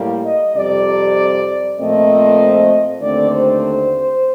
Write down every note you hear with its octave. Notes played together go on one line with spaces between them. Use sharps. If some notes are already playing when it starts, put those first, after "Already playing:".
Already playing: A2 G3 A#3
D#5
F2 C3 G3 D5
A#2 F3 A3 C4 D#5
D#2 D3 A3 C4 D5
C5